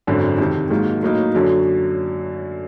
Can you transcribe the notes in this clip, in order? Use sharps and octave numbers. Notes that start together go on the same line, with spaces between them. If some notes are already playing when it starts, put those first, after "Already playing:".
G#1 F#2 D3
F2 C3 D#3
G#2 D#3 F#3 A#3
A2 F#3 A#3 D#4
F#2 D3 F#3